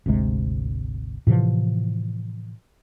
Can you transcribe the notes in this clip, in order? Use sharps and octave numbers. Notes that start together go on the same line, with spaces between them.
G#1 D2 C3 G#3
A2 C3 E3 F3